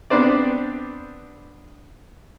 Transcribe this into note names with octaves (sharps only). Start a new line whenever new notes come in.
B3 C4 D4 B4 C5 D5